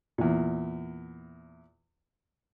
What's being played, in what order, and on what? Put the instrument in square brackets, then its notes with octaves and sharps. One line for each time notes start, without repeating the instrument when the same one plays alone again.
[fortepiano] E2 A#2